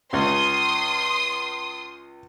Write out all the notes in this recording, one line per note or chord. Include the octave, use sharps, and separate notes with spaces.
C#2 C#3 C6 D#6